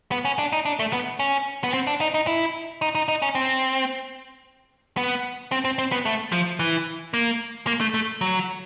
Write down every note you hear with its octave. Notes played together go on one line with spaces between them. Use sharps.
B3
C#4
D4
D#4
D4
A3
B3
C#4
B3
C4
D4
D#4
D#4
E4
D#4
D#4
D#4
C#4
C4
B3
C4
C4
C4
B3
A3
F3
E3
A#3
A#3
A3
A3
F#3